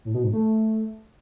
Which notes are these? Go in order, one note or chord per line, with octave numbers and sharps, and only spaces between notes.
A2
B2
G#2
A3